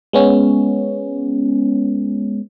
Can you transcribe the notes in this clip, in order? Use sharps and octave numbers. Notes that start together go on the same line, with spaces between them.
G#3 B3 C#4